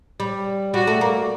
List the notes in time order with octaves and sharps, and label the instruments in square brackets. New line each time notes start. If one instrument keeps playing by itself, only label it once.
[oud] G3
[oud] G3 [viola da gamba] F#4
[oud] A3
A#3